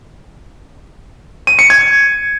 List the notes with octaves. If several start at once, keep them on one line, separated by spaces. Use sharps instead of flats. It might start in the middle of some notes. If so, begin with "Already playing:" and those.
D#7
C#7
G#6